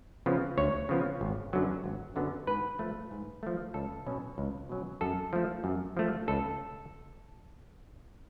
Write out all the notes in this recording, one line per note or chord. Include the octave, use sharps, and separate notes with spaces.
C#3 F3 B3
D2 C#5
C#3 F3 B3
G#1
F#2 D3 F#3 B3
G#1
F#2 D3 F#3 B3
G#2 B4
F3 A3
G#2
F3 A3
C#2 A4
B2 F#3 C#4
C#2
B2 F#3 C#4
F#2 A4
F3 A3
F#2
F3 A3
C#2 A4